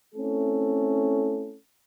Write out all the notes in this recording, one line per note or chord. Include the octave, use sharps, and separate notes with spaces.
A3 C4 C#4 E4 A4